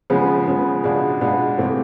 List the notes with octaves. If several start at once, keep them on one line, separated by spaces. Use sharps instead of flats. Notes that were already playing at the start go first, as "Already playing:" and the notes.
C#3 F3 G#3 B3
C#3 F3 G#3 B3
B2 G#3 B3 D4 F4
B2 G#3 B3 D4 F4
C3 E3 A3 C4